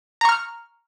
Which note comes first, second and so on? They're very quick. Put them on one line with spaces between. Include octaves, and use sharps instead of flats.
A#5 C#6 F6